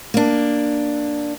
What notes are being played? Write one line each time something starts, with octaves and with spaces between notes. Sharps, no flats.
A#3 D4